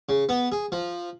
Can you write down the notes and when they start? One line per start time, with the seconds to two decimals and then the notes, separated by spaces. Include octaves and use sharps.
0.09 C#3
0.29 B3
0.52 G#4
0.72 F3